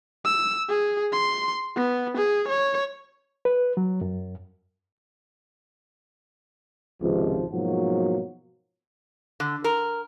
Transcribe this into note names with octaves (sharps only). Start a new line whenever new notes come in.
E6
G#4
C6
B3
G#4
C#5
B4
F#3
F#2
G#1 C#2 C3 F3
G#2 B2 F3 F#3 A#3 F#4
D3
A#4